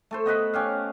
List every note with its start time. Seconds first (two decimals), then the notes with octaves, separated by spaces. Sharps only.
0.11 A3 A4 C5
0.25 B3 D#5 F#5 B5
0.53 C#4 G4 F5